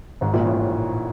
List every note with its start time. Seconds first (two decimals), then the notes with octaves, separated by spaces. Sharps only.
0.21 G#1 G#2
0.33 A#1 A#2
0.45 A1 A2